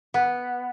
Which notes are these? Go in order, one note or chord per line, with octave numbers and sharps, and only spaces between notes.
B3